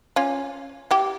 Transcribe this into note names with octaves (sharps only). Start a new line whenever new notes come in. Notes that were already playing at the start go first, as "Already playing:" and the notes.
C#4 F4
E4 G4